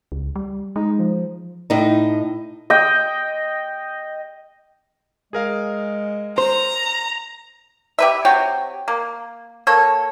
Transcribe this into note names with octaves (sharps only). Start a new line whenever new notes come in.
C#2
G3
G#3 D#4
F3
A2 D#4
D#5 G5
G#3 G#4 A#4 F5
C5 A#5
G4 B4 E5
C3 F#4 C#5 G5
A#3
A#3 A4 C#5